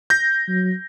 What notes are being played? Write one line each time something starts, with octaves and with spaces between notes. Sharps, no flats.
G6 A#6
F#3